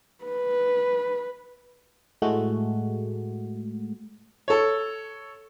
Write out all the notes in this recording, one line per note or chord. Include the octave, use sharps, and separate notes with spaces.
B4
A2 G#3 A3 F#4
A4 C#5